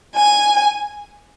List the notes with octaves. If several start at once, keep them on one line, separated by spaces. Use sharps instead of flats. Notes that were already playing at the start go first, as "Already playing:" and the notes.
G#5